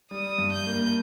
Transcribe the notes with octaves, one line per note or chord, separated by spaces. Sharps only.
G3 D#6
G2
G6
A#3